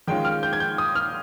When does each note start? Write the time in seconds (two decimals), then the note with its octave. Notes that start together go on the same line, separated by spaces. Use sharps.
0.08 D#3 G#3 C#4 F4 G5
0.25 F6
0.43 G6
0.53 G#6
0.60 G6
0.78 D#6
0.95 F6